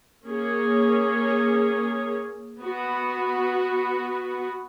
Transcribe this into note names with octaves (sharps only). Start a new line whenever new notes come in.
A#3 C#4 G#4 C#5
B3 F#4 B4